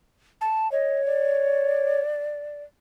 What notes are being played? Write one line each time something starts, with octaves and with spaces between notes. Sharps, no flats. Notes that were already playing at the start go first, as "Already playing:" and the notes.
A5
C#5 D#5
D5